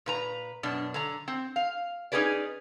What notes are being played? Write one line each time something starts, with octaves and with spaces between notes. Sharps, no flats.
A#2 B4 A#5
F#2 B2 D4
D3 A#5
C4
F5
C#4 D#4 E4 G#4 B4 D5